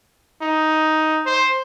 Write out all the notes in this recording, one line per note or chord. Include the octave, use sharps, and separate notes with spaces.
D#4
C5